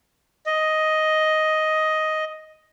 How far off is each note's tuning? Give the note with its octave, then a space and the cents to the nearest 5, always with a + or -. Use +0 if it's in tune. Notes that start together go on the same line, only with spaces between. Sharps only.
D#5 +5